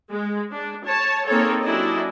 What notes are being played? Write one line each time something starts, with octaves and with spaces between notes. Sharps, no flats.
G#3
D4
C#5 A5
A#3 C4 D#4 G#4 A4 C#5
F#3 C#4 D4 E4 G4 D#5